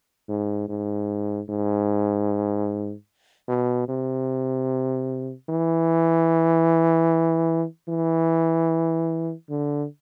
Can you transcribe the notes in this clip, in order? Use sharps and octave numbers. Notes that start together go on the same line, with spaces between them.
G#2
G#2
G#2
B2
C3
E3
E3
D3